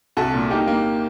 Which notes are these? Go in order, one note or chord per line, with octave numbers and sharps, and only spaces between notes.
C2 F#4 A4
A#2
A#3 D#4 G4
A#3